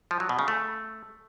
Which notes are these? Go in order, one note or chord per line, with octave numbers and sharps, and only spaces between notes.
F3
F#3
B2
C#3
A3